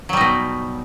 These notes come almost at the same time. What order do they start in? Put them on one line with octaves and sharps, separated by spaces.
F#3 G3 D#4 B2